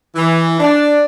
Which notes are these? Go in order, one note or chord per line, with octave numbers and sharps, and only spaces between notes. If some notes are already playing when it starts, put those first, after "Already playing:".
E3
D4